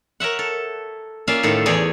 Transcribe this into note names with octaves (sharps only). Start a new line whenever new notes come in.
A#4 C#5 E5 F#5
A4
A#3 C#4 F4 D5 E5 F5
A2 D#3 A4
E2 G#4 C#5 D5